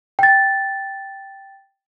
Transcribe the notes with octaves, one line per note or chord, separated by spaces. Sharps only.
G5 A6